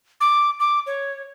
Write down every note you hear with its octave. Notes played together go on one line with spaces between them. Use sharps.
D6
D6
C#5